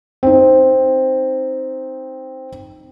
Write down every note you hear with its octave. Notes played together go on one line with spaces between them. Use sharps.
C4 D#4